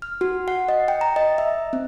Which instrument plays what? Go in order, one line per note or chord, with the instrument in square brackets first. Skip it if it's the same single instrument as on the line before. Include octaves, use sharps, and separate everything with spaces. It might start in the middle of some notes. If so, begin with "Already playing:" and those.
[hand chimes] F6
F#4
F#5
D#5
G5
A#5
D#5
E5
C4